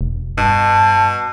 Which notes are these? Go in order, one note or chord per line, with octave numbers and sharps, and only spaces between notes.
E1
G2 B2 A5